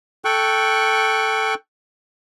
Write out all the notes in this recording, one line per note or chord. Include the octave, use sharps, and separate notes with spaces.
A4 G5 C#6 F#6